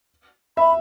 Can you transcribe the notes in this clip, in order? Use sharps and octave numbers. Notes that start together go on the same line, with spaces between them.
E5 B5